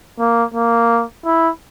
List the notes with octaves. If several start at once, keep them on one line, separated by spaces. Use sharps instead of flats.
A#3
A#3
E4